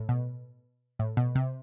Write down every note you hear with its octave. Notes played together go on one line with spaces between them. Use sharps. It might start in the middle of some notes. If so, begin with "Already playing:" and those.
Already playing: A2
B2
A2
B2
C3